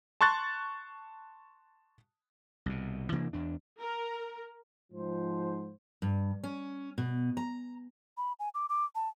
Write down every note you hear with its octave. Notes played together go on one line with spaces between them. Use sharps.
A5 C6 C#6 F#6 A6
C2 B2
C3 E3 A#3 D4
E2 D4
A#4
G#2 F3 C5
G2
C#4
B2
A#5
B5
G#5
D6
D6
A5